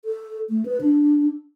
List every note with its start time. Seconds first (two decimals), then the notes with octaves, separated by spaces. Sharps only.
0.05 A4
0.50 A3
0.65 B4
0.81 D4